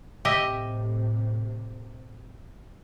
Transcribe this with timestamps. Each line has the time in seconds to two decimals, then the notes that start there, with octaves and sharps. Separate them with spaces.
0.25 A2 C3 G4 D#5 E5